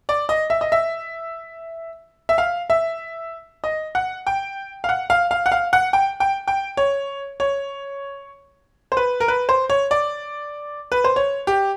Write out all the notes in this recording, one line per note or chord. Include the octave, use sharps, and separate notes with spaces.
D5
D#5
E5
D#5
E5
E5
F5
E5
D#5
F#5
G5
F5
F#5
F5
F5
F#5
F5
F#5
G5
G5
G5
C#5
C#5
C5
B4
A#4
B4
C5
C#5
D5
B4
C5
C#5
G4